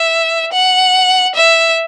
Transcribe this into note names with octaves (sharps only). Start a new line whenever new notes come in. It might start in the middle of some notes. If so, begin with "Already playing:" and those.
Already playing: E5
F#5
E5